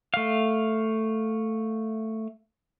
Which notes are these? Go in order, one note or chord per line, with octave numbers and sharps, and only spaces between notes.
A3 F5